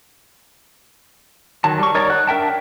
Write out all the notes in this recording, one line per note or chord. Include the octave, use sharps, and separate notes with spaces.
D#3 F#3 A5
G3 C#6
D#4 A#4 C#5 D5 A#5
F#5
D4 A#4 E5 G5 A5